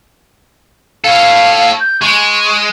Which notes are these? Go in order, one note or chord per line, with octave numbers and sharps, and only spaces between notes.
A4 C#5 F5
G6
G#3 C#6